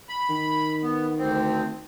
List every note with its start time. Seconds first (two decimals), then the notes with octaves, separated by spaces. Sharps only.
0.09 B5
0.29 D#3
0.83 B3
1.18 D2 C4